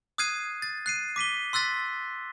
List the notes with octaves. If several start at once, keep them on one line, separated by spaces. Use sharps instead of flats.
D#6 F6 F#6 G#6 C7 D#7
A6
F#6 C7 D#7
D6 B6 D#7 G7
C6 E6 F#6 A6 B6